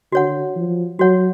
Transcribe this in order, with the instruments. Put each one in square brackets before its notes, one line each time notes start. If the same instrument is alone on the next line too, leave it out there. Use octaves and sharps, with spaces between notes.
[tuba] D3 [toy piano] F#4 C#5 F#5
[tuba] F3
[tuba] F#3 [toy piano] F#4 C#5 F#5